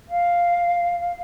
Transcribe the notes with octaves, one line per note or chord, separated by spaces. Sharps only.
F5